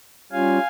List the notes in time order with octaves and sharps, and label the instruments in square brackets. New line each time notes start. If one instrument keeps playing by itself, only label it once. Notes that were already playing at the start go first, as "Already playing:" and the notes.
[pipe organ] G3 C#4 F4 F5 G#5